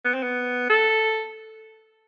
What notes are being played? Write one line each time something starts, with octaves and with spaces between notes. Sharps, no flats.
B3
C4
B3
A4